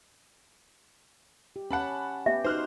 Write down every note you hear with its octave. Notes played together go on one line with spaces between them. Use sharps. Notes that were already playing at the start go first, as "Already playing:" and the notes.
G4
C#4 F#5 A5 B5
B3 G4 E5
D#4 F#4 C5 F6 F#6